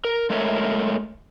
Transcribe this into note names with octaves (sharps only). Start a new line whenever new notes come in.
A#4
G#3 A3 A4 A#4 C#5 E5